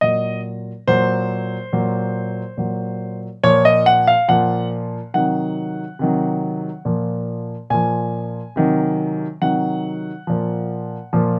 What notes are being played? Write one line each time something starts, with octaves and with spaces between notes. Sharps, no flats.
A#2 F#3 D#5
A#2 F#3 C5
A#2 F#3
A#2 F#3
A#2 F3 C#5
D#5
F#5
F5
A#2 F3 F#5
C3 D#3 F#3 F#5
C3 D#3 F#3
A#2 F3
A#2 F3 G#5
C3 D#3 F#3
C3 D#3 F#3 F#5
A#2 F3
A#2 F3